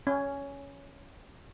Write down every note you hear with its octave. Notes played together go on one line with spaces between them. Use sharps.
C#4